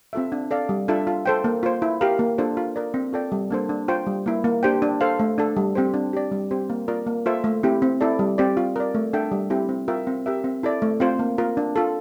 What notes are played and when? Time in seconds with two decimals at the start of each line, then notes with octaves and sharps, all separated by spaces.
0.13 C4 F4 A4 E5
0.32 D4
0.51 A4 D5 F5
0.69 G3
0.88 D4 F4 A4 E5
1.07 F4
1.26 A4 C5 G5
1.44 A#3
1.63 F4 C5
1.82 E4
2.01 G4 A#4 F5
2.19 A#3
2.38 D4 F4 A4 C5
2.57 F4
2.76 A#4 D5
2.94 C4
3.13 F4 A4 D5 G5
3.32 G3
3.50 A#3 D4 A4 C5
3.69 D4
3.88 F4 C5 G5
4.06 G3
4.26 A#3 E4
4.44 A#3
4.63 D4 G4 C5 G5
4.82 D4
5.01 A4 C5 F5
5.20 A3
5.38 D4 A4
5.57 G3
5.75 C4 G4 C5
5.94 D4
6.13 G4 D5
6.32 G3
6.51 C4 G4 C5
6.70 A#3
6.88 F4 A#4 D5
7.07 A#3
7.26 F4 A4 C5 E5
7.44 A3
7.63 C4 E4 G4
7.82 C4
8.01 E4 A4 D5
8.19 G3
8.38 C4 G4 D5
8.57 F4
8.76 A#4 D5
8.95 A3
9.13 D4 A4 E5 G5
9.32 G3
9.50 C4 E4 G4
9.69 C4
9.88 F4 A#4 E5 G5
10.07 C4
10.26 G4 A#4 E5
10.44 C4
10.63 E4 A4 D5
10.82 A3
11.00 C4 F4 C5
11.19 A#3
11.38 F4 A#4
11.57 D4
11.76 F4 A4